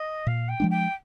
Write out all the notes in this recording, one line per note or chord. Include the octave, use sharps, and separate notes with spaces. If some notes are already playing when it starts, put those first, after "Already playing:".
Already playing: D#5
A#2 F5
G5
F3 G#3 D4
G5